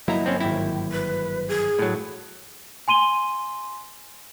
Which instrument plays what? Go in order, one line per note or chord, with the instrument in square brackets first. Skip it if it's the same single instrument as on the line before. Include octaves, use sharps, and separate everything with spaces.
[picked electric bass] G1 F#3 A#3 [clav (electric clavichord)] E4 A#5 [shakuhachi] D#5
[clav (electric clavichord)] C4 C#4
[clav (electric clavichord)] G#1 E4 [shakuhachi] G5
[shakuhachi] B4
G#4
[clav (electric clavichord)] A2 F#3
[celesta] G#5 C6 D#7 G7